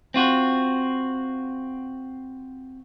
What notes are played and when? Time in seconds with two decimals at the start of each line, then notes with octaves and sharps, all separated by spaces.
0.14 C4 F4 F#4